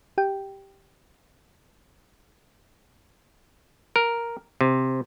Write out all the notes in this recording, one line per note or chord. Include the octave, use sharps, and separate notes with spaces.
G4 G5
A#4
C3